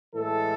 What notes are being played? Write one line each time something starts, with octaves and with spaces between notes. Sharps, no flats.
A2 E3 G#3 A4